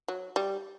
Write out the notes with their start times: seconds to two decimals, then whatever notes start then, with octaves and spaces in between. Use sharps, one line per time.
0.08 F#3
0.36 G3